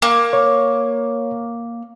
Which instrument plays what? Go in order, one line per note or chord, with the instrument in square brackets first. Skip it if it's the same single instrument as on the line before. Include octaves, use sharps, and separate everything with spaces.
[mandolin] A#3
[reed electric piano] C#5